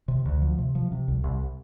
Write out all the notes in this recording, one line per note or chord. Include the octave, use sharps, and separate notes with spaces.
C3
D2
F3
C3
F3
C3
C2
C2